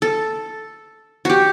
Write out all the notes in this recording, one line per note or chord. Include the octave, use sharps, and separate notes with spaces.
A4
F#4 G4